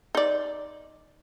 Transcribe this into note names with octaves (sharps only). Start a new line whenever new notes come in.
D#4 D5